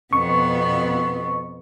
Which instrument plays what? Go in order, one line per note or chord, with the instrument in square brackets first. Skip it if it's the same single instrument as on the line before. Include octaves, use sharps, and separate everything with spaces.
[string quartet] F2 B2 B3 [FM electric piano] C#6